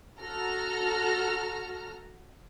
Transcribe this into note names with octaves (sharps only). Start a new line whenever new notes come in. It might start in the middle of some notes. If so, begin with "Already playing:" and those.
F#4 A4 A#5 F6